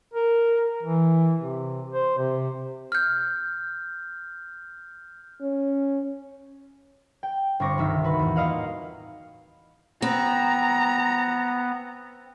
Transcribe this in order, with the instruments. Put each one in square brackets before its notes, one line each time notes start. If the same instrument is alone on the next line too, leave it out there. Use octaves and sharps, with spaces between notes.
[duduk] A#4
E3
C3
C5
C3
[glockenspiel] F6 G6
[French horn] C#4
[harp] G5
G1 C4 C#6 D6 A#6
C2 D#3 E5 A#6
F#4 B4
E2 A2
A#3 F4 D#5 F5 F#5
[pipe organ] B3 [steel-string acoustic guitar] C4 [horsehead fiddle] A#5